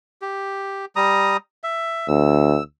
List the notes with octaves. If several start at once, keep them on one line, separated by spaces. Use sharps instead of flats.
G4
G3 A#5 D#6
E5
D2 E6